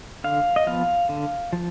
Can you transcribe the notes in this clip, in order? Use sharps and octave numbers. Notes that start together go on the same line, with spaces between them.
D3 F5
D#5
F3 B3 F5
D3
F3